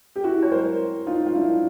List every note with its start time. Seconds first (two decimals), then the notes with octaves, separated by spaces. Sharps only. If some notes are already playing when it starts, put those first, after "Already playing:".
0.16 G4
0.24 E4 F#4
0.43 C#5
0.51 A#4 C5
1.06 D#4 F4
1.26 F4
1.35 D4 E4